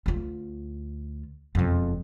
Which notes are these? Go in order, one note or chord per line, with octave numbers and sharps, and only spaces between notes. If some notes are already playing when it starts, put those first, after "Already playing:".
D2 F4
E1 F2